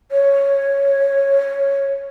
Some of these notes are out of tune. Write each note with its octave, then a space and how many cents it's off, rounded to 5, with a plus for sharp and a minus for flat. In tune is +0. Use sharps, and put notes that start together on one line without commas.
C#5 -5